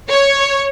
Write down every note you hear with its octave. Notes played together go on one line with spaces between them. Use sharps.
C#5